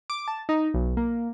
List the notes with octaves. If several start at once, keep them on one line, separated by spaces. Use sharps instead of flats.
D6
A5
D#4
B1
A#3